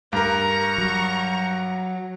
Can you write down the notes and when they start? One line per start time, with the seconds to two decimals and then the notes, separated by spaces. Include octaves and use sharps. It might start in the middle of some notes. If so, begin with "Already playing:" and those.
0.13 G2 A#4 A#5 C#6
0.78 F#3